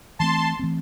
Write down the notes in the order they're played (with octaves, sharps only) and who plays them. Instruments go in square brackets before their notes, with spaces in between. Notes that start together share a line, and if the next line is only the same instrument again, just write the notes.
[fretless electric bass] E3 A3 C4 [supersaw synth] A5 C6
[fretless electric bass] E3 A3 C4